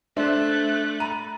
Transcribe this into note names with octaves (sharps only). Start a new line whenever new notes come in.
A3 D4 C5 E5 F#6
A#5 B5 D#7